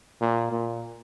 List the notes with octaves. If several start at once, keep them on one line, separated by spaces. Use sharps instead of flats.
A#2
A#2